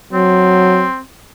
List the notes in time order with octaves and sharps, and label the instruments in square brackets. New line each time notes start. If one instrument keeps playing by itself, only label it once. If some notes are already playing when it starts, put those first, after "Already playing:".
[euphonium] F#3 [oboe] C4